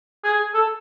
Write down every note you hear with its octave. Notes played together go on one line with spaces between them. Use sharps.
G#4
A4